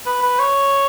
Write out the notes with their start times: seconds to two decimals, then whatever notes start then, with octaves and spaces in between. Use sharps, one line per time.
0.06 B4
0.22 B4
0.39 C#5